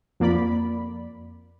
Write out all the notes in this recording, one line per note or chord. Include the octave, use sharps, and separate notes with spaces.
F2 A#3 D5 B5